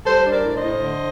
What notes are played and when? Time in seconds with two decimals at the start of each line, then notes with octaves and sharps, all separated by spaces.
0.06 G3 A4 C5
0.26 D4
0.31 A#4 D5
0.45 A2 D5
0.57 C5 D#5
0.64 A2
0.83 D3